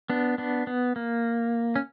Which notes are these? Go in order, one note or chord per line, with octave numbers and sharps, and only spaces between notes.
B3 D4
B3 D4
B3
A#3
C#4